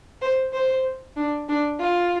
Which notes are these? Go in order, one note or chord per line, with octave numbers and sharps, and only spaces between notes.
C5
C5
D4
D4
F4